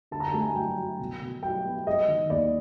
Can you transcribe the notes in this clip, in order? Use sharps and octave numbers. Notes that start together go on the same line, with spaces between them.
D3 A5
A#5
A5
A3
G#5
F#3 G5
F#3
B2
B2
F#3 G5
B3
G#3 D#5
D#3
D#2 D5